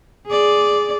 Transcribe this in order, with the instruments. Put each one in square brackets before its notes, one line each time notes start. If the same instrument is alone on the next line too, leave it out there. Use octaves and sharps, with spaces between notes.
[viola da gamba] G#4 D5